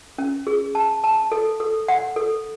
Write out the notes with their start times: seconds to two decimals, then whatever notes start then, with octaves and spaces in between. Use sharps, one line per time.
0.18 C#4
0.47 G#4
0.75 A5
1.04 A5
1.32 A4
1.60 A4
1.88 F#5
2.16 A4